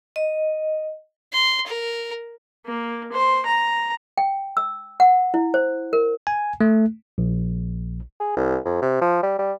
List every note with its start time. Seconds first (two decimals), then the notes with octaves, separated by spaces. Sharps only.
0.16 D#5
1.32 C6
1.66 A#4
2.66 A#3
3.12 C5
3.46 A#5
4.18 G5
4.57 E6
5.00 F#5
5.34 E4
5.54 C5
5.93 A#4
6.27 G#5
6.61 A3
7.18 A#1
8.20 G#4
8.37 C2
8.66 F2
8.82 C3
9.02 F3
9.23 G3
9.39 G3